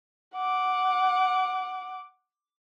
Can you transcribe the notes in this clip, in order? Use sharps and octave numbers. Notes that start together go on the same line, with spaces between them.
F#5 D6